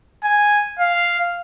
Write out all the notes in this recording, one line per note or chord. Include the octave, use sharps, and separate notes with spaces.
G#5
F5